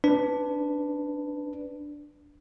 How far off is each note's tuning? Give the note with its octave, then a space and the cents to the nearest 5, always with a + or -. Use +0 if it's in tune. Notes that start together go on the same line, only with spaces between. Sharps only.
D4 +0 B4 +10